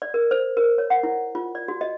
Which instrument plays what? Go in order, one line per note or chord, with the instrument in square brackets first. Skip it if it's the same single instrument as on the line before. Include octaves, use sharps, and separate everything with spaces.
[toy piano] D5
A#4
C5
A#4
C#5
F#5
E4
F4
D5
F#4
D#5